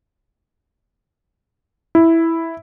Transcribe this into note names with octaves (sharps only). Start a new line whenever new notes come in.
E4